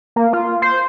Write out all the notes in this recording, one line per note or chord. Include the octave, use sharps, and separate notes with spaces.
A#3
F4
C5